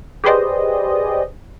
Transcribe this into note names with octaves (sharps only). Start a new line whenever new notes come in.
G4 G#4 B4 C5 D5 D#5